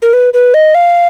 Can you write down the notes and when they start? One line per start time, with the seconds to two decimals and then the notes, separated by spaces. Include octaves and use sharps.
0.02 A#4
0.13 B4
0.34 B4
0.54 D#5
0.75 F5